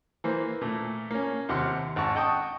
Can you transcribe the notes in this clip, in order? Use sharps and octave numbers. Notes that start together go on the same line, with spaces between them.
E3 A#3 C5
A#2 A3
A#3 C#4
D#2 C3 F#5 C6 F6
G#1 F#5 A5 C#6
D#5 F#5 G5 A5 C#6 D#6